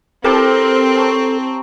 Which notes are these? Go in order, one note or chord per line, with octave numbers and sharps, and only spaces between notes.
C4 E4 G4 A4 A#4
C#5 A5 A#5